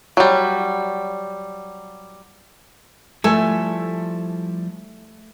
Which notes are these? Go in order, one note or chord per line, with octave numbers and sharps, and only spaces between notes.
F#3 G3
F3 G3 A3 E4 A4 G#5